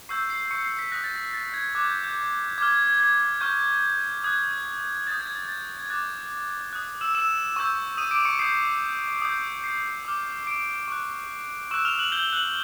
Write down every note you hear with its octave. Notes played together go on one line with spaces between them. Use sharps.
C#6 E6 G6 C7
C7
C#6 C#7
C7
B6
D#6 F#6 A#6
A6
A#6
A6
G#6
D6 F#6 G#6
G6
G6
D6 F6 G#6
G#6
G#6
G#6
G#6
C#6 F6 G6
D#6 F#6 G#6
D#6 G6 A6
G#6
A6
A6
G#6
D6 F#6 A6
D#6 F#6
E6 E7
E6 E7
C#6 E6 G6
D#6 D#7
D6 D7
C#6 C#7
D#6 G6 C7
D#6 G6
C7
D6 F6
D6 D7
C#6 F#6
C#6 E6 F#6 E7
F6 F7
F#6 F#7
G6 G7
G7
F#6 F#7